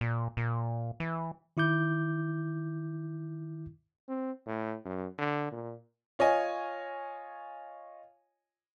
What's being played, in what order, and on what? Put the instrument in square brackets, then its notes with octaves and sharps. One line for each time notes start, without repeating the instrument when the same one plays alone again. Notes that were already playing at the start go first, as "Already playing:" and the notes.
[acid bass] A#2
A#2
E3
[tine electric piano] D#3 E4 D6 G6
[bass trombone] C4
A2
F#2
D3
A#2
[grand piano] F4 C#5 D#5 G#5